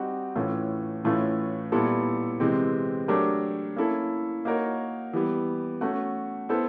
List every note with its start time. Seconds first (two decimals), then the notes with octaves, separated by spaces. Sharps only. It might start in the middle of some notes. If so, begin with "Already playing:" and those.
Already playing: G3 C4 D#4 F#4
0.36 A2 E3 A3 C#4 F4
1.05 A2 E3 A3 C#4 F4
1.72 A#2 G3 B3 E4 A4
2.40 C3 E3 G#3 C4
3.08 F#3 A3 D4 G4 A#4
3.76 A#3 C#4 E4 A4
4.45 A#3 D#4 F#4 A#4 C#5
5.13 E3 G3 B3
5.81 A3 C#4 F#4
6.49 B3 E4 A4 C5